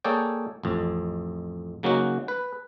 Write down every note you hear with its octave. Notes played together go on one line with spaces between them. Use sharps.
A#3 G#4 A4 C#5 D5 G5
A1 F2
C#3 F#3 A#3 C#4 D#4 F#4
B4